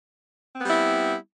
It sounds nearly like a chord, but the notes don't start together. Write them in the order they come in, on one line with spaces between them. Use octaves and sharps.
C4 B3 G3 E4